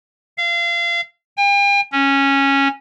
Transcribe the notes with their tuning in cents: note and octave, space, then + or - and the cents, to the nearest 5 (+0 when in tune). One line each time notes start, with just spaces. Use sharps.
F5 -30
G5 +45
C#4 -10